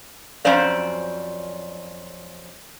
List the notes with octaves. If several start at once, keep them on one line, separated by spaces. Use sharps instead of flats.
F2 F#3 C#4 C5 D5 F5